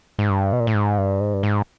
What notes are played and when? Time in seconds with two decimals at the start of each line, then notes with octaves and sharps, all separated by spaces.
0.19 G#2
0.30 G2
0.52 B2
0.60 A#2
0.67 A2
0.75 G#2
0.98 G2
1.20 G#2
1.34 G2
1.43 G#2